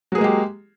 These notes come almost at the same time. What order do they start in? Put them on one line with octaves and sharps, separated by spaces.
F#3 G#4 A#3 G#3 G4